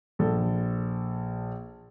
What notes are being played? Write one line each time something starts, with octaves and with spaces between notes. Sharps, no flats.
A#1 A4